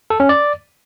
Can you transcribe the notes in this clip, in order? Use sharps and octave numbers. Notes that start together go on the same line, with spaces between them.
A4
C#4
D5